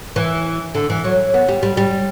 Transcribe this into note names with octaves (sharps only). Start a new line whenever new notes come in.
E3
D3
E3
F#3
B3
G3
G3
G3